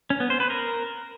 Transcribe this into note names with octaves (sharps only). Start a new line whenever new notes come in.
C#4
B3
C5
B4
A#4